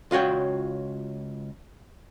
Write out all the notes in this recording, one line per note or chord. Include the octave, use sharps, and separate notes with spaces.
C#2 F4 F#4 C#5 G5